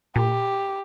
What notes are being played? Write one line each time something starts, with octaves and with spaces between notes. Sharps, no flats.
A#2 G4